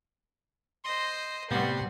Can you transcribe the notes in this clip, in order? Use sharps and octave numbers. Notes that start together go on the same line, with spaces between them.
C5 D#5 C6
A2 C3 G3 B3 F#4 G5 A5 C6